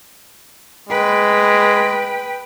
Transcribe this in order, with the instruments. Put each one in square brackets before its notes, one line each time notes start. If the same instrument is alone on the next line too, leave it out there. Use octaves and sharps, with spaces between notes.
[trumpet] G#3 [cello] B4 G5